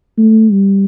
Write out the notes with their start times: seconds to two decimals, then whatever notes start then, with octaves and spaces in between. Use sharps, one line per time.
0.17 A3
0.51 G3